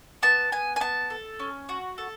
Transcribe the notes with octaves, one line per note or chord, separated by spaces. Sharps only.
B3 A5
B3 G#5
G#5
B3 A5
A4
C#4
F#4
A4